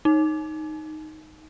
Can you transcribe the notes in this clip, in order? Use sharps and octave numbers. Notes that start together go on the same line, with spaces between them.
D#4